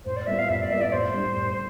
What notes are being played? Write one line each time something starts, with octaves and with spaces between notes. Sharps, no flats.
A2 C5
D5
G3 B3 F4 E5
F5
A2 E5
D5
G3 B3 F4 E5
D5
A2 C5
G3 D4
A2